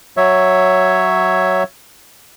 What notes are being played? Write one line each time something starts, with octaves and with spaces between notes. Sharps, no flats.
F#3 C#5 E5